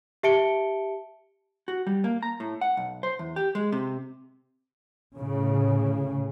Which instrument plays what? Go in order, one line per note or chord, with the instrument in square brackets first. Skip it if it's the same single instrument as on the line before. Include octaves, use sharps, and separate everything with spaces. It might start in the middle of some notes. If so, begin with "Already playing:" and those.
[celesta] G4 E5 A5 C#7 D7 G7
[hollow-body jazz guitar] F#4
G3
A#3
A#5
A2
F#5
B1
C5
E2
G4
G#3
C3
[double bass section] A2 C#3